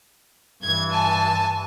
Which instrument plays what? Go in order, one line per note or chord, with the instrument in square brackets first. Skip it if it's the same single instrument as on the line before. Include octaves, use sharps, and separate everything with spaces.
[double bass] G2 E3 [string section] G#6
[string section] G#5 A5